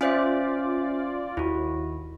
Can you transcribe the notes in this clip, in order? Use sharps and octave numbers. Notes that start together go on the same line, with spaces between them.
C#4 F4 C5 D5 E5
D#2 E4 F#4